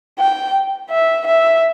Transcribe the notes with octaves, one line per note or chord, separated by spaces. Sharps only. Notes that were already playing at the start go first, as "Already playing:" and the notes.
G5
E5
E5